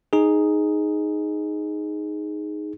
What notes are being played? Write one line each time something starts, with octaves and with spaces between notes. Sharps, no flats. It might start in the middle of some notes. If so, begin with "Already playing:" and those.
D#4 G#4